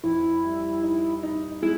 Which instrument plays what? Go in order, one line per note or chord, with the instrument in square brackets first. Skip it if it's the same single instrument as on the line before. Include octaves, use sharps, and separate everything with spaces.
[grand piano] F2 [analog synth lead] E4
[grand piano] G3
D#4
D#4
[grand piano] G#3 [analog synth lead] E4